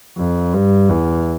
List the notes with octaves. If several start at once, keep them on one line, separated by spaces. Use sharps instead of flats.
F2
G2
E2